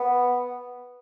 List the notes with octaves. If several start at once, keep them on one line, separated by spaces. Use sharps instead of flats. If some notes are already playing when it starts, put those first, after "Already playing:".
Already playing: B3